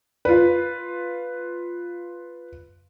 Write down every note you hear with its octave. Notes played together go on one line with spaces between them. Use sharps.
F4 B4